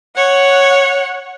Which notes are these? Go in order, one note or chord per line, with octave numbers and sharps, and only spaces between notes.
C#5 F#5